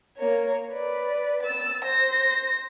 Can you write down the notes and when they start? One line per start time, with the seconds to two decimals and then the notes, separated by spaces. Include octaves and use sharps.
0.17 A#3 C#5
0.72 B4 D5
1.43 E6 A6
1.85 C5 A#6